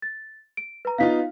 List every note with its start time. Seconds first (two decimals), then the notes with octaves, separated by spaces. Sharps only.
0.02 A6
0.57 D7
0.85 B4 A#5
0.98 B3 D#4 F4 F5 B6